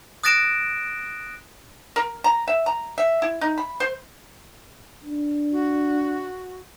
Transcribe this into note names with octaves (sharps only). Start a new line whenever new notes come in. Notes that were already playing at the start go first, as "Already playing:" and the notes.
D#6 F#6 A6 A#6 D7 E7
A#4
A#5
E5
A#5
E5
E4
D#4
B5
C5
D4
F#4